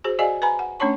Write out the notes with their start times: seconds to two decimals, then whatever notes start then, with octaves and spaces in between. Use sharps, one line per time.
0.04 F#4 G#4 C5
0.19 F#4 G#4 D5 D#5 F5 G#5
0.42 B4 G#5 A#5 B5
0.59 F#5
0.80 A3 C#4 D4 C#5 A5 C#6